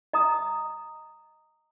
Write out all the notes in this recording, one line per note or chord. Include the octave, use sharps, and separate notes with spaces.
D#5 A#5 D#6